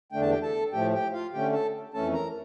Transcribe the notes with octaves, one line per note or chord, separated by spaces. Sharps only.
E2 D3 A3 D4 G5
A5
G4 G5
A4 A5
A2 F3 A3 G4 G5
G4 G5
F4 F5
D3 A3 C#4 G4 G5
A4 A5
F2 E3 A3 C#4 A4 A5
A#4 A#5